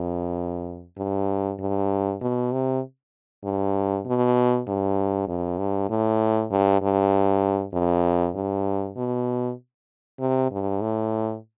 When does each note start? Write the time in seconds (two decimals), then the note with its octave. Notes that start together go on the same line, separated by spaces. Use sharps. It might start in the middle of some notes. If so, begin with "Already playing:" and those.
Already playing: F2
0.98 G2
1.59 G2
2.21 B2
2.52 C3
3.44 G2
4.06 B2
4.67 G2
5.28 F2
5.58 G2
5.90 A2
6.51 G2
6.82 G2
7.74 F2
8.35 G2
8.97 B2
10.20 C3
10.51 G2
10.81 A2